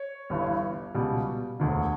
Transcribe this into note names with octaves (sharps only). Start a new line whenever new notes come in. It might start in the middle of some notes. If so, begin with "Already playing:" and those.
Already playing: C#5
G1 G2 E3
C#2 B2 G3
E1 D2 D3